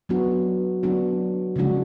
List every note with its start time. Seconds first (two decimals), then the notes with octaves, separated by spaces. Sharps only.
0.09 F#3 B3 D4 F#4
0.83 F#3 B3 D4 F#4
1.56 C#3 F3 G#3 D4 F#4